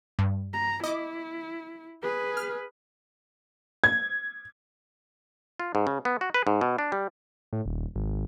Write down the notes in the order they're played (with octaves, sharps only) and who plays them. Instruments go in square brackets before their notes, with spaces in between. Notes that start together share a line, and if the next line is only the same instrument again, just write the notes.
[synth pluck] G2
[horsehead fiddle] A#5
[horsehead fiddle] E4 [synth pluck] D#5 D6
[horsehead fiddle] G#4 B4
[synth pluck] F6
[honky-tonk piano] G#6
[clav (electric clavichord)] F4
G#2
C#3
B3
F#4
B4
G#2
B2
D4
G3
[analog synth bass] A2
D#1
G#1